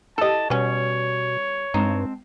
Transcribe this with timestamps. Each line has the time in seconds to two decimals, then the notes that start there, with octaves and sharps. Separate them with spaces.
0.18 E4 G4 A4 D#5 A5
0.50 B2 G3 B3 C#4 C#5
1.74 G2 G#3 C4 D#4 A5